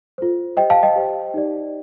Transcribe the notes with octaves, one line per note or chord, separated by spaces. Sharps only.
F4 A4 C5
G4 C5 D#5 G5
F5 A5
D#5 G5
G4 C5
D#4 G4 D5